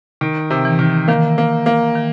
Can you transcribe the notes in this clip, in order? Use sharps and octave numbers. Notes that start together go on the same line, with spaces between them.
D#3
C3
E3
D#3
D#3 A#3
A#3
A#3
D#3